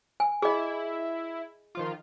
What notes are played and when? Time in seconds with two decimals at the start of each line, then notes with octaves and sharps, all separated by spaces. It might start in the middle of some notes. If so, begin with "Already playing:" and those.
0.20 G#5
0.42 E4 G#4 D#5
1.75 D#3 F3 F4